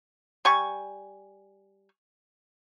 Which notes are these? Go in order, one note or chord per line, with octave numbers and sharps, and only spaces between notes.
G3 G#5 C#6